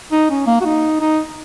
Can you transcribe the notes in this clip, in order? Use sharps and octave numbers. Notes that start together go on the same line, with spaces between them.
D#4
C#4
A#3
F#4
D#4
D#4